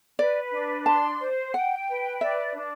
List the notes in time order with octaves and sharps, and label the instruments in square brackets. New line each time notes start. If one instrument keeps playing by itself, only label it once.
[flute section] B4 [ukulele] D5
[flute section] D4
[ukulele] A5 [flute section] C6
[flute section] C5
[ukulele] F#5 [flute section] G5
[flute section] B4
[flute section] D5 [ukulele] E5
[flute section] D4